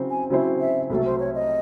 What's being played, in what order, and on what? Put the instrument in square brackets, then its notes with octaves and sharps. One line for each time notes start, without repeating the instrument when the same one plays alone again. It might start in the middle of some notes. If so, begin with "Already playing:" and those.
Already playing: [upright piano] C#3 F#3 C4 E4 C5
[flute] G#5
[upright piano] C#3 F#3 C4 E4 C5
[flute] E5
[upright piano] C2 C3 F#3 A3 [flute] A4
[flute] C5
C#5
D#5